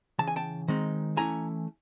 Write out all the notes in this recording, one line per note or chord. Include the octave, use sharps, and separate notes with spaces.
C#3 E3 A5
G#5
G5 A5
D#3 G#3 C4 D#4
E3 A3 C#4 E4 G#5 A#5